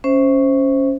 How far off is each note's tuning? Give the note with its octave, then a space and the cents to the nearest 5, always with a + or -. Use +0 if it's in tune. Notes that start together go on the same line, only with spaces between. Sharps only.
C#4 +0 C5 +0 E5 -5